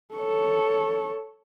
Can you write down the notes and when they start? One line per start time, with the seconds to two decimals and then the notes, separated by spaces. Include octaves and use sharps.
0.14 A4 C#5